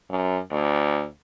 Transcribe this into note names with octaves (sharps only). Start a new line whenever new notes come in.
F#2
D2